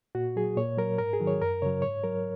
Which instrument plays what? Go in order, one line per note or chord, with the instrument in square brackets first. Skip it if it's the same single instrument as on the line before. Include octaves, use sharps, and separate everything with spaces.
[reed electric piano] A#2 F#4
F#3 G#4
A#2 C#5
F#3 A#4
G#2 A#4
G#4
D#3 F#3
C#5
F#2 A#4
C#3 F#3 C#5
G#2 C#5
F#3 A#4